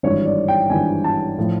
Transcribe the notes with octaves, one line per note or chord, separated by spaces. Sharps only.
G#1 G2 E3 C#5
D5
G5
G#1 G2 E3 G#5
A5
A2 F3